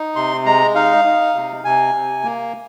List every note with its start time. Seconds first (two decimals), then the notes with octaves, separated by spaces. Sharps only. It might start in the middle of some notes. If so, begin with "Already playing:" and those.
Already playing: D#4
0.16 C3 C6
0.46 G#3 A#5
0.75 D#4 F5
1.05 D#4
1.35 C3
1.64 C3 G#5
1.95 C3
2.24 A#3